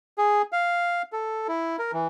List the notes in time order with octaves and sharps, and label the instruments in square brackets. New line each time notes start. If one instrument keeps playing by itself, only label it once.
[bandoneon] G#4
F5
A4
E4
A#4
E3